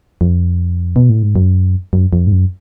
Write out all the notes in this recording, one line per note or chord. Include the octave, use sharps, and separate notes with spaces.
F2
B2
A2
G#2
F#2
F#2
F2
G#2
F#2